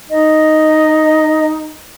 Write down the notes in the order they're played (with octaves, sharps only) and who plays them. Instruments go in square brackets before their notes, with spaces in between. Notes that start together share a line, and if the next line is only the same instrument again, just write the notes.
[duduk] D#4 [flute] D#5